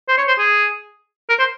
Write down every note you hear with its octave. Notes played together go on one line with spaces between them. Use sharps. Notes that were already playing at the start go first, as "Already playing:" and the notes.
C5
C#5
C5
G#4
A#4
C5